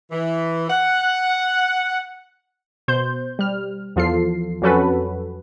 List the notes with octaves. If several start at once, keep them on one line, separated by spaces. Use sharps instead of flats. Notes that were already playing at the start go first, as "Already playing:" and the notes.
E3
F#5
B2 C5 G6
G3 F6
E2 F3 F4 A4 C7
F2 F#3 C#4 F#4 A4 B4